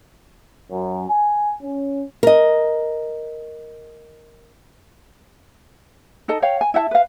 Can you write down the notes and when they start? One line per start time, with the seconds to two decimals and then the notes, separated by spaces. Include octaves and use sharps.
0.70 F#2
1.09 G#5
1.62 C#4
2.23 A#4 D#5
6.28 D#4 A4 D#5 A5
6.42 C#5 F5 G5
6.61 G#5
6.74 E4 E5 F#5 A5
6.91 B4 F5